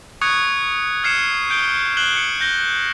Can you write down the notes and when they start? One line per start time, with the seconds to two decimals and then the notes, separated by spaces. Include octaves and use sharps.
0.21 C#6 D#6 F#6 G#6 C#7
1.04 F6 G#6 C7 C#7 E7
1.50 G6 D7 G7
1.97 F#6 C7 E7 F#7 G7
2.16 C#7
2.41 G6 A#6 G7